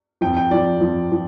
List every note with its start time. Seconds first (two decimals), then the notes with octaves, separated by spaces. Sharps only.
0.21 F2 F3 G5
0.37 G5
0.50 F2 F3 D5
0.80 F2 F3
1.12 F3